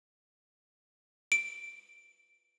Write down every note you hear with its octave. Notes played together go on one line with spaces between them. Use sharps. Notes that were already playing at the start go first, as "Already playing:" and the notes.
D7